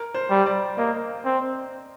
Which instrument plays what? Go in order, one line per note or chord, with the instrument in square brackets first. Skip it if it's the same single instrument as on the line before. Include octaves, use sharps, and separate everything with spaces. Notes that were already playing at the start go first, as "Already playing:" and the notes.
Already playing: [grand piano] A#4
C5
[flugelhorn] G3
[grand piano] D5
[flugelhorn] A#3 [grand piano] D#5
[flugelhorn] C4